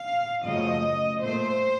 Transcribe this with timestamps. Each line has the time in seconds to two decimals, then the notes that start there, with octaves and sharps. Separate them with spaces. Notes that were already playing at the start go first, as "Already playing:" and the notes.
Already playing: F5
0.45 F#2 C#3 F3 A3 D#5
1.21 A#2 A3 C5